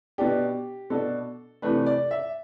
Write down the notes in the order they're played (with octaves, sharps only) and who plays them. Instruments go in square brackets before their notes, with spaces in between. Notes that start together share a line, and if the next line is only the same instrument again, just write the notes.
[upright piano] B2 B3 D4 G4
B2 B3 D4 A4
C3 E3 A3 D4 B4
D5
E5